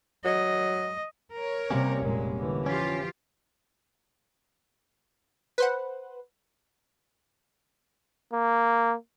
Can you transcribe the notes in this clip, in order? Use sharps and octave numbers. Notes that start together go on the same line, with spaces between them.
F#3 D#5
A#4 C#5
C3 G3 A#3 C#4
F1 A#2 G#3
D3 E3
F3 C#4 F4 G4
B4 C5 F#5
A#3